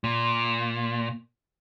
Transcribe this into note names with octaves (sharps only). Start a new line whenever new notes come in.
A#2